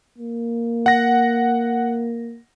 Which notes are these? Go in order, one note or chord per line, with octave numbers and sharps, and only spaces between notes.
A#3
F#5 A#6